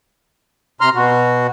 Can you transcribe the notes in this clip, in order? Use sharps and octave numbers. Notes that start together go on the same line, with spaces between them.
C3 A#5 C6 F6
B2 F#4